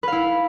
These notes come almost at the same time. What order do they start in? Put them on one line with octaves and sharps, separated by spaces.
B4 F5 E4